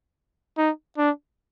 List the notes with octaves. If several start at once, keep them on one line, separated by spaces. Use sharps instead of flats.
D#4
D4